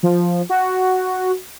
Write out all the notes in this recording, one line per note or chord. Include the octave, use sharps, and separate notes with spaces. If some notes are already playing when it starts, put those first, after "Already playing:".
F3
F#4